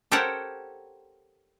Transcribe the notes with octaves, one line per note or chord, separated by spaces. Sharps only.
G4 A4 A#4 C5 C#5 F#5